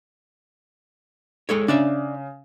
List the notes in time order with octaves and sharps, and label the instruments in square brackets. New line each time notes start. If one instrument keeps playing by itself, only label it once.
[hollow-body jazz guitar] G#3 A4 C#5
[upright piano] C#3 [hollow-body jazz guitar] D4 D5 E5